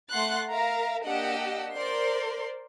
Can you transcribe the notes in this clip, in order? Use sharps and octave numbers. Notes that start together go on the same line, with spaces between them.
A3 F#5 C6 F#6 A6
A#4 E5 F5 A#5
A#3 D4 G4 D#5 F#5 E6
A#4 C5 D5 C6